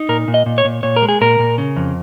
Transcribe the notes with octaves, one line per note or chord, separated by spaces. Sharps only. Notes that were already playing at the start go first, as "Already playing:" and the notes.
Already playing: D#4
A#2 A#4
A#2
D#5
A#2
C#5
A#2
A#2 C#5
A#4
G#3
G#4
A#2 A#4
A#2
C#3
F2